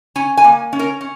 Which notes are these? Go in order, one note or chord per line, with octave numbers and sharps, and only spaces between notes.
C#4 G#5
G#5
A#3
C#4
A#4
C#4